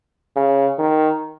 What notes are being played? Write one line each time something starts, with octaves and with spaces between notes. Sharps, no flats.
C#3
D#3